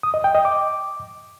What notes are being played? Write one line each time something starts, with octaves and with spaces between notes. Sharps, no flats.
D#6
D#5
G5
D#5
D6